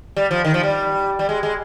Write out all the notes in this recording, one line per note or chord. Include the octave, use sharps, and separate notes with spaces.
G3
F3
D#3
F3
G3
G3
G#3
G#3